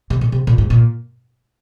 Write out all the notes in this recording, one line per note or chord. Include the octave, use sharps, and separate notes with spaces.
C3
A#2
C3
A#2
G#2
A#2